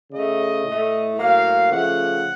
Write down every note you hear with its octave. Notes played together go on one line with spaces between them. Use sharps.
C#3 A3 D#5
A2 A3
A2 F#3 A#3 F5
C#3 F3 A3 F#5